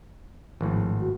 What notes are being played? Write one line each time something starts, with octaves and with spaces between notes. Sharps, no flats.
G#1 A2 F3
F#4